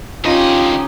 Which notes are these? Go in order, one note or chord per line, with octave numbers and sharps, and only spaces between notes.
D3 C#4 D#4 F4 G4 D#5